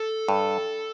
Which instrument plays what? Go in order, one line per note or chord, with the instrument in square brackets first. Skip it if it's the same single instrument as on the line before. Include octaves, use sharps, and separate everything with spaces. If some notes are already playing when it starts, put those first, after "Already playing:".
Already playing: [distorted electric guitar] A4
[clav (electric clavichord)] G2